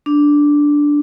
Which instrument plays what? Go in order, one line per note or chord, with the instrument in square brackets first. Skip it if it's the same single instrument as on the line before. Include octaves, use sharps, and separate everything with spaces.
[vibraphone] D4